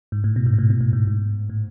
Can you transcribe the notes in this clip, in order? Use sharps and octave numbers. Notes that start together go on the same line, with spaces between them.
G#2
A2
B2
G#2
B2
A2
B2
A2
G#2
G#2
A2